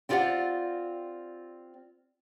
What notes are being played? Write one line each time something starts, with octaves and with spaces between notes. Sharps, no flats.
C4 E4 F4 G4 D5 F#5